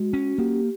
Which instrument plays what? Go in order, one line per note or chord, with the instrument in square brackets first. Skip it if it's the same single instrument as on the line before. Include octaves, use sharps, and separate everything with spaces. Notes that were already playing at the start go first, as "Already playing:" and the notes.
Already playing: [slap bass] G#3 [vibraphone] F#4
[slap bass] C#4
[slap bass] A#3 [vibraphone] G4